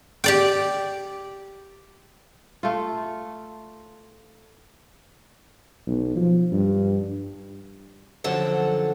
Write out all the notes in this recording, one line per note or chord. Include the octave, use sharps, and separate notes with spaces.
G4 D5 G5
A3 F4
B1
F3
G2
F#2 D3 F3 F#3 A4 F#5